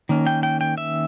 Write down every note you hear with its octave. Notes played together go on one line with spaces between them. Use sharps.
D#3 A#3 C#4
G5
G5
G5
E5